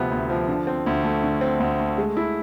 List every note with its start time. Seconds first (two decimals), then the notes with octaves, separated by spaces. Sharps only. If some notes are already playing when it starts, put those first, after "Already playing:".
Already playing: D2 C3 F3 B3
0.11 D2
0.30 F3
0.48 D3
0.67 C4
0.86 D2
1.04 A3
1.24 D3
1.41 C4
1.60 D2
1.80 A3
1.98 G#3
2.17 E4